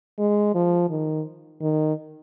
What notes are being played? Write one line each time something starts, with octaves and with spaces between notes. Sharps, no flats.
G#3
F3
D#3
D#3